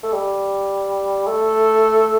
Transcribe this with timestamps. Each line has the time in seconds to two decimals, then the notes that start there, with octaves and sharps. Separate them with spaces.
0.03 A3
0.13 G3
1.27 A3